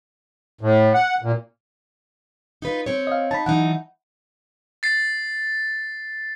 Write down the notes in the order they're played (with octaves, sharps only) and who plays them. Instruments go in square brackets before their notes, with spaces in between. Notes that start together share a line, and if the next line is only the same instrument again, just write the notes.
[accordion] A2
F#5
A#2
[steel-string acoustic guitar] D#4 F4 B4
C4 C#5
[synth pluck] D#5 F5
[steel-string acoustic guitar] D#4 [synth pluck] A5 B5
[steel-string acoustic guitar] E3 F#3 D#4 [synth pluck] F#5
[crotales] A6 C7